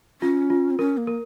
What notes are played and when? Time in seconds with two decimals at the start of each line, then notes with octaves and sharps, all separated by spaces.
0.21 C#4 F4
0.50 F4
0.70 C4
0.79 C#4 A#4
0.97 A#3
1.07 A#4